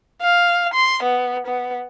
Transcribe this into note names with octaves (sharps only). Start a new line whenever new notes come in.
F5
C6
B3
B3